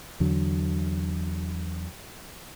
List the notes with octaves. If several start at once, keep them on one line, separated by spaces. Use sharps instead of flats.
E2 D3 F#3